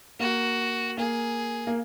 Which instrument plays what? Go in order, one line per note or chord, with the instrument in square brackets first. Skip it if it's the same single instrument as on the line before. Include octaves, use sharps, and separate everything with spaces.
[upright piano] A#3 [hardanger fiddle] F#4
[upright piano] A#3 [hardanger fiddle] G#4
[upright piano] A#3